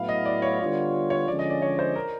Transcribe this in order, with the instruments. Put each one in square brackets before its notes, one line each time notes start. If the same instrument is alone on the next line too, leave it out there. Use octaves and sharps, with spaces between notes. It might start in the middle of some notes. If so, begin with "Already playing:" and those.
Already playing: [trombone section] A2 F#3 B3 E4 [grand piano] F5
[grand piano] D#5
D5
C#5
[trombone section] D3 G3 B3 D4 F4
[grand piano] C#5
[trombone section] D3 F3 G#3 C#4 [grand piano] D5
[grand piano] D#5
D5
C#5
C5
A#4